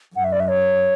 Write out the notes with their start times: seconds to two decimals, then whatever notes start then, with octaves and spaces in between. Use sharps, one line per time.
0.16 F#2 F#5
0.24 E5
0.32 D5
0.40 E5
0.48 C#5